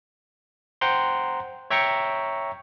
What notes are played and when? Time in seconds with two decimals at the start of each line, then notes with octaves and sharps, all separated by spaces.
0.81 C5 F#5 G5 A#5 C6
1.70 C#5 E5 G5 A#5 C#6 C#7